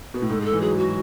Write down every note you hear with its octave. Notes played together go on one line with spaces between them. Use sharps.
B2
A2
G#2 A4
G#4
A4
E3
F#3 G#4
F#4